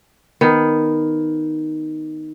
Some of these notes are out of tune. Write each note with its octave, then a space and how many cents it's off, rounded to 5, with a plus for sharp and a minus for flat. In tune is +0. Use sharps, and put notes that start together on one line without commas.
D#3 +0 B3 +0